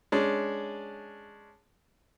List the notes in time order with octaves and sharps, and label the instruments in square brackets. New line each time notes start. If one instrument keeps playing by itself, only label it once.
[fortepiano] G#3 C#4 D4